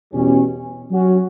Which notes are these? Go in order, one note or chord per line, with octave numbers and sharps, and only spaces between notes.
E2 B2 G3 C#4
F#3 C#4 F#4